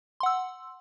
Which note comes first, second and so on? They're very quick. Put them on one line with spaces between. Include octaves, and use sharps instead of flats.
C6 F#5 E6